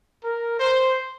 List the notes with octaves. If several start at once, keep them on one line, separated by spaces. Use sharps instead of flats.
A#4
C5